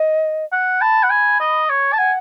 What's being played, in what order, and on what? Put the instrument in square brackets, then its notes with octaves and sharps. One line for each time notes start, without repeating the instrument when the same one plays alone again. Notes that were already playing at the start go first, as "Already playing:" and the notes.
Already playing: [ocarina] D#5
[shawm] F#5
[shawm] A5 [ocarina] B5
[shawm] F#5
G#5
D#5
C#5
A5
[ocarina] F#5 [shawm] G#5